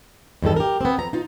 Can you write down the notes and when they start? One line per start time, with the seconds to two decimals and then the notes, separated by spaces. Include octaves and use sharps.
0.42 E2 G2 D#3 A4
0.56 G4 A#4
0.81 B3 C4
0.98 F2 A#5
1.13 D#4 F4